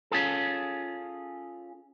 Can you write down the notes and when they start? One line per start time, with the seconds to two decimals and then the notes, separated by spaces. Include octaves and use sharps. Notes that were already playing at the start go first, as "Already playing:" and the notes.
0.11 C#4 F4 G#4 A4